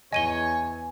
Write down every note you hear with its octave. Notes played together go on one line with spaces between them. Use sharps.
E2 C#5 D#5 G#5 D#7 G7